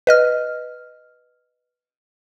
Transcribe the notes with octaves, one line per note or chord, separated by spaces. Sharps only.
B4 D#5 F6